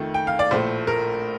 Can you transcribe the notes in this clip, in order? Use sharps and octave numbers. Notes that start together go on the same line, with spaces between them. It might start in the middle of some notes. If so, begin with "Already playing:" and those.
Already playing: F2 D#3 A3
G5
F5
D5
A#1 A2 A3 C5
A#4